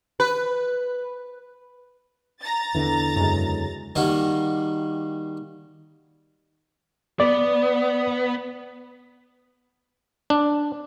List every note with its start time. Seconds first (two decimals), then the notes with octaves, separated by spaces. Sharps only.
0.20 B4
2.41 A#5 A6
2.75 E2 D3 E3
3.16 F#2 C#3 G#3
3.96 D#3 G3 A#3 D#4 F#4
7.20 B3 D5
10.30 D4